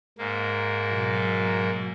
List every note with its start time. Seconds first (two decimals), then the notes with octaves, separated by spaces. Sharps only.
0.18 G#2 A#3
0.90 B2 F#3